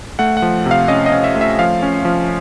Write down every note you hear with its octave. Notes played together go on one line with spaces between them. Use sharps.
A3 F#5
F#5
F3
C3
F5
C#4 D#5
D#5
C#4
E5
A3
E5
F3 F5
C#4
F3